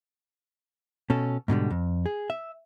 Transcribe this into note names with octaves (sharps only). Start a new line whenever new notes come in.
B2 C#4 A4
G#2 B2 D3 G3
F2
G#4
E5